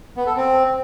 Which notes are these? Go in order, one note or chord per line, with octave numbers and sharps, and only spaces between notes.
B3
A4
C4